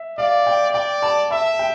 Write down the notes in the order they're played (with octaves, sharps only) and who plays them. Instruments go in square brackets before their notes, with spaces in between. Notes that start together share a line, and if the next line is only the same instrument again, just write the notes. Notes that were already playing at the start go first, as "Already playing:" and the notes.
Already playing: [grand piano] E5
[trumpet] D5 [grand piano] F5
[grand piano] G5
[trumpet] D5 [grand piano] G5
[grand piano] A5
[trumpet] E5 [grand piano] A5
[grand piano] G5